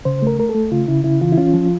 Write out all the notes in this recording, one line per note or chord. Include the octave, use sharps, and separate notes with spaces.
C#3 C5
A3 A#4
A3 A#4
A4
A3
C#3 F4
C#3 E4
C#3 E4
E3 F4
E4
C#4 F4
F3